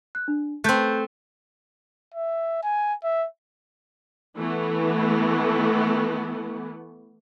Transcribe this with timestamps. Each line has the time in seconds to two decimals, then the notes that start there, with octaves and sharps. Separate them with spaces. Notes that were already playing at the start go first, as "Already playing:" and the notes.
0.15 F#6
0.28 D4
0.64 A3 C4 F#6 G6
2.14 E5
2.63 G#5
3.04 E5
4.39 E3 A3 B3